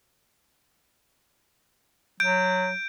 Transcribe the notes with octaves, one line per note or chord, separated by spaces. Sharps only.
F#3 G6 D7